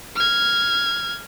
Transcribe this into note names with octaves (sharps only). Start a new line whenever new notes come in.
F6 G#6